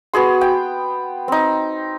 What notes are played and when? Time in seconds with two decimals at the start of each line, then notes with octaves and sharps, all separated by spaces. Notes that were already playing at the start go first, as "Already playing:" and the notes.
0.13 B3 F#4 G#4 C6
0.41 G5
1.28 C4 D#4